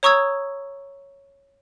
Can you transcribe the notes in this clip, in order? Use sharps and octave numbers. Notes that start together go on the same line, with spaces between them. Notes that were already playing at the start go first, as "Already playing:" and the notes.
C#5 A#5 C#6 D#6 E6 G#6